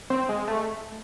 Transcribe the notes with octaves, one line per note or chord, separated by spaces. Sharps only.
C4
G#3
A3